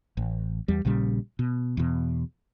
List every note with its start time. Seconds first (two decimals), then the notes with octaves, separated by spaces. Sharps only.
0.17 A1
0.68 E2 G3
0.85 A#1 A#2 C#3 G3
1.39 B2
1.77 E2 B2